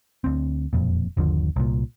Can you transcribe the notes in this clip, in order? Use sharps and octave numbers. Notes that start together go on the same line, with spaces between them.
D2 C4
E1 F2 A#2
G1 D#2 D3 F3
C2 A#2